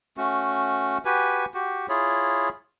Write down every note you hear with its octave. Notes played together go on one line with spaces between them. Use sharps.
A3 C#4 F#4
F#4 G4 B4 G#5
F#4 G4
E4 F4 G#4 C#5